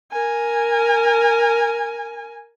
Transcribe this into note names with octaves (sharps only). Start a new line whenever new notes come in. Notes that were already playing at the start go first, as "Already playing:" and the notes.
A#4 G#5